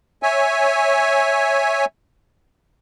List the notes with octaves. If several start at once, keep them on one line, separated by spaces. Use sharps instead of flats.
C#5 E5 G#5